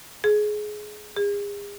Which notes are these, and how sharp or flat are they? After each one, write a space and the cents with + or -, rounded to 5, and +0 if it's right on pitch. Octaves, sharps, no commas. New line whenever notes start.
G#4 +20
G#4 -40